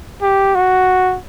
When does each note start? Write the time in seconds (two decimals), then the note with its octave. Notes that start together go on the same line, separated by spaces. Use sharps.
0.22 G4
0.55 F#4